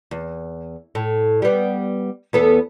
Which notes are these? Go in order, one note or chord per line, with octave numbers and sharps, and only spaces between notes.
E2
A2
G3 B3
E2 B3 A4